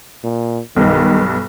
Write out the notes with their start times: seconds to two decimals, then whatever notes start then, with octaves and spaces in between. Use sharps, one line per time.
0.24 A#2
0.77 B1 G2 D#3